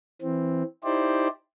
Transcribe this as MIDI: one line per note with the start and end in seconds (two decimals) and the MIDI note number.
0.22 0.63 52
0.22 0.63 60
0.84 1.28 63
0.84 1.28 64
0.84 1.28 67
0.84 1.28 72
0.84 1.28 74